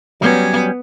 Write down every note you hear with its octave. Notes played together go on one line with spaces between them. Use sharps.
F#3 G3 B3 C#4